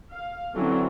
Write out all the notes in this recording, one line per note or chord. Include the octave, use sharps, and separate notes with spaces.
F5
D3 E3 F#3 C4 C#4